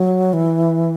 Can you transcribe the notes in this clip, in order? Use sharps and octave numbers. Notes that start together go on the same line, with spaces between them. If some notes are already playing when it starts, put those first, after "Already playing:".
Already playing: F#3
E3